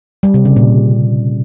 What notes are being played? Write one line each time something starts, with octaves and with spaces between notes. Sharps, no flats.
G3
C3
C#3
A#2